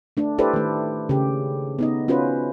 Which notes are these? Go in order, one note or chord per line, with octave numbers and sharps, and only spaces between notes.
A3 D4
E4 G4 A4 B4 C5 D5
D#3 A3
C#3 G4
B3 D#4 D#5
C#4 F4 F#4 B4 C5